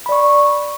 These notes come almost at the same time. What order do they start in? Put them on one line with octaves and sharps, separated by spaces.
B5 D5 C#6